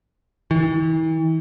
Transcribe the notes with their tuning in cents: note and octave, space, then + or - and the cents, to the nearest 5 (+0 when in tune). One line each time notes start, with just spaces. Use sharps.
E3 -40